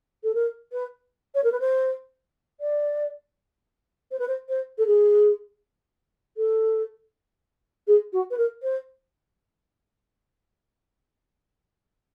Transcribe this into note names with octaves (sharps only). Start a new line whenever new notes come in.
A4
A#4
B4
C#5
A#4
B4
C5
D5
C5
B4
C5
C5
A4
G#4
A4
G#4
F#4
B4
A#4
C5